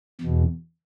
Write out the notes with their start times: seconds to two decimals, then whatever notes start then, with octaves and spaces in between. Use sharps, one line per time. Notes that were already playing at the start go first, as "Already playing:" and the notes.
0.21 E2 B2